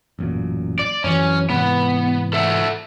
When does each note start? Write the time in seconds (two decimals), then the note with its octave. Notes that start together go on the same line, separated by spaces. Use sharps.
0.19 A1 F#2 A#2
0.79 D5
1.04 F#2 E3 F#3 C#4
1.50 G#2 C3 E3 B3
2.33 A4 E5 F#5